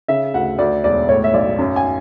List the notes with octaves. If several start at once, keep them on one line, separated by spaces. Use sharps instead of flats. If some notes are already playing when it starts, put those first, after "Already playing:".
C#3 E5
D2 F#5
D2 D5
E1 D5
A2 C#5
E5
B1 D5
F#2
G#5